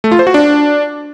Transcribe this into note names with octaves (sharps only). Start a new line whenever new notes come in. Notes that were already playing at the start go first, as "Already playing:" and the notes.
A3
F4
C5
F#4
D4